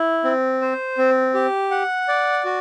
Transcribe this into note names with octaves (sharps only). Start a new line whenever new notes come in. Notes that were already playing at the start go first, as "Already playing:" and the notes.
Already playing: E4
C4
C5
C4
G4
F#5
D5
F#4